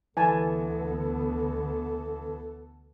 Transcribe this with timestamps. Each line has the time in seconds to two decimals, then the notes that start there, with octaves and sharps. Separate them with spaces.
0.17 D2 D3 E3 B3 A4 G#5 A5